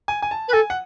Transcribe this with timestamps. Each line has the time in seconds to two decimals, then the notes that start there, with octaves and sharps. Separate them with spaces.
0.08 G#5
0.22 G#5
0.31 A5
0.48 B4
0.53 A4 G#5
0.70 F#5